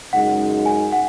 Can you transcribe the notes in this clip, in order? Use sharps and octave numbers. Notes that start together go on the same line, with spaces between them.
F#2 C#3 G#3 D#4 F#5
G#5
F#5